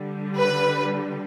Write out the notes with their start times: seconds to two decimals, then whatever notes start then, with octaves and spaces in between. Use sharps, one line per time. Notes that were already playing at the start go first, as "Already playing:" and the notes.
Already playing: D3 G3
0.38 B4